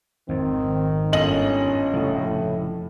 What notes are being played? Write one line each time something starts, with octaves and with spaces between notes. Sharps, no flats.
G#1 F2 D#3 C4
G1 C#4 D#5 F#7
F1 A2 C#3 F3